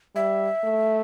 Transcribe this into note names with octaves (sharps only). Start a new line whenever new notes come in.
G3 E5
A3